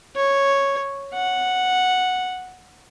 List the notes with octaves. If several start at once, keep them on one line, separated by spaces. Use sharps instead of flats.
C#5
F#5